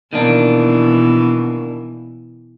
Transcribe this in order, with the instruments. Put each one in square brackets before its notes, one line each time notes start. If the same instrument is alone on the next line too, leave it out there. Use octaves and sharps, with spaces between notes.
[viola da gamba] B2 E3 [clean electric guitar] D#3 A#3 D4